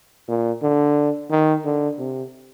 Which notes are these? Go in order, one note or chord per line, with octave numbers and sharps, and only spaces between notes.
A#2
D3
D#3
D3
C3